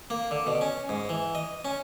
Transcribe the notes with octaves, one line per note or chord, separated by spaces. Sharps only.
A#3
D3
B2
C#4
G#2
E3
D#5
C#4